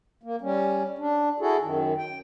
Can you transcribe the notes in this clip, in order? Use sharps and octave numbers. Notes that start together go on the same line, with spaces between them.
A#3
G3 C#4
D4
E4 F#4 G#4 A4
F#2 D#3
G5